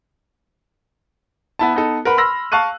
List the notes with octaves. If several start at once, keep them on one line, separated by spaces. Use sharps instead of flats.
B3 E4 A5
B3 D#4 A4
A#4 B4 F#5 B5
B5 C6 E6 F6 A#6
F5 A5 C#6 F#6 D#7